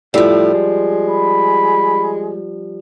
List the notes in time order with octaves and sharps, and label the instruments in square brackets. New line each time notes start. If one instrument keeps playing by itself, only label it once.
[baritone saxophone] A2 [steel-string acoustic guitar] F3 G3
[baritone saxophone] G#3
[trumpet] B5